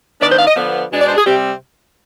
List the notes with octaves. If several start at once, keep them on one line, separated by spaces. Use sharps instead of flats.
D#3 B3 D4 D5
C5
F5
D#5
D3 F3 B3
B2 G#3 D4
D5
C5
G#4
C3 G3 C4 G4